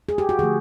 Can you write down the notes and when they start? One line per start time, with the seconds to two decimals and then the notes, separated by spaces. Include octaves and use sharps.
0.09 G#4
0.18 G4
0.29 F#4
0.39 D3 F3 A3 G#4